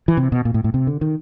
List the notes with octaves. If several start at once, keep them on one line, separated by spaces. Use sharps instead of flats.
E3
C3
B2
A#2
A2
A2
C3
D3
D#3